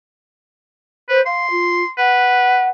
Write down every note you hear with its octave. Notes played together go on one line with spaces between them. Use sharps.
B4 C5
F5 C6
F4
B4 F#5